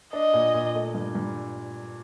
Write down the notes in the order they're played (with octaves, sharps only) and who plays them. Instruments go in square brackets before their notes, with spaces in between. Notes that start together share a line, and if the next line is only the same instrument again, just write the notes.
[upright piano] D4 [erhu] D#5
[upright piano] A#2
A#2
A3
G2
G2